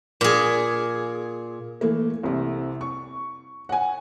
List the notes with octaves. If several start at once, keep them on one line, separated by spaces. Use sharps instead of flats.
A#2 G#4
E3 A3 A#3
C2 C3
C#6
F#5 G#5